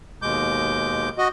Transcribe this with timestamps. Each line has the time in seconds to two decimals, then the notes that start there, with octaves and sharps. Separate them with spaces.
0.22 D#2 B2 G#3 D6 G6
1.18 F#4 D#5